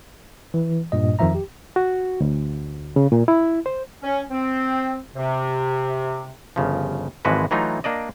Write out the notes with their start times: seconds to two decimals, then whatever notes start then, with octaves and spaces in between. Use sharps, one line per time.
0.54 E3
0.92 G2 A#2 D#5
1.19 F2 D#3 F3 E5 A#5
1.35 G4
1.76 F#4
2.20 D2
2.96 C#3
3.12 A#2
3.28 E4
3.66 C5
4.03 C#4
4.31 C4
5.16 C3
6.56 G1 C#3 F3
7.25 G#1 E3 F3 G#3 F#4 B4
7.51 E3 F#3 A3 D#4 F4
7.84 A#3 D4 D5 D#5